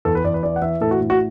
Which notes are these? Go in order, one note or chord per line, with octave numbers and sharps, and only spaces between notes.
E2 A4
B4
E2 D5
B4
E3 D5
F#5
E3 E5
A2 A4
F#4
A2
F#4